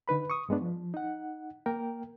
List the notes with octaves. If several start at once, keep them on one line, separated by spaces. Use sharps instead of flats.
D3 D#4 B4 B5
C#6 D#6
G2 G#3 B3 D4
F3
D#4 F#5
A#3 A#4 G5